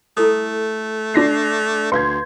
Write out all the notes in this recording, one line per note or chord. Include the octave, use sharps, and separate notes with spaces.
A3 E4 A4 D#6
D4 A#6 C7
D2 B4 F5 C6 G6 G#6